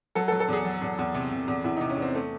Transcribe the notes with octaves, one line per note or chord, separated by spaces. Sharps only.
F#3 A4
A4
F#3
A4
E2 G#4
F#3
E2
E2
C3
C3
E2
E2 E4
D#4
C3
C#4
E2 C4
A3